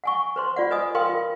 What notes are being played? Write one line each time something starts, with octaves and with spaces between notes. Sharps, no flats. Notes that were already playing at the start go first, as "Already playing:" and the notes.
F#5 G#5 C#6
B4 C5 C6
F4 D5 F#5
B4 D#5 G#5 D#6
A#4 B4 F5 G5 C6
F4